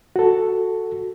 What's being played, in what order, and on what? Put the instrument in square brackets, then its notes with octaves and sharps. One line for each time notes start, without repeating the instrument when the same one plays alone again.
[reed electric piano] F#4 A4